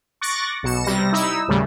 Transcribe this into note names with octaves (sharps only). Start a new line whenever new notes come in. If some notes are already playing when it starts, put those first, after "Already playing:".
C#6 D6 F#6 A6 A#6
B1 B2 C#7 E7
C3 G3 A#6
D#4 E4 E6
D#2 A2 C#3 G3